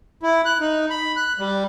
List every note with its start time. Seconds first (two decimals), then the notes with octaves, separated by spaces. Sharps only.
0.23 E4
0.45 F#6
0.60 D#4
0.90 B5
1.16 F#6
1.39 G3